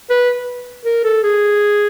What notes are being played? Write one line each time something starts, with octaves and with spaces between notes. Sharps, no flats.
B4
A#4
A4
G#4